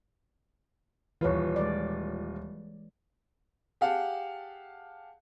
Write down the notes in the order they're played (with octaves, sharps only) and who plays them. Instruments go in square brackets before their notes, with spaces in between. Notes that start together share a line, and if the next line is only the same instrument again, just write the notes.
[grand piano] D#1 F4 [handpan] E3 B4 C#5
[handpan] G#3 D5
[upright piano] G4 G#4 F5 F#5 A5